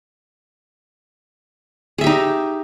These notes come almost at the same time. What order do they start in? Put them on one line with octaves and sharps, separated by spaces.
G#4 E5 G4 D#4